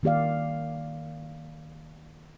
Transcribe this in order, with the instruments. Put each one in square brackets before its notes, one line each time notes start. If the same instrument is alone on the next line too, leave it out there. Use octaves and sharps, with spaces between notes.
[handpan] D#3 A#3 G4 D5 F5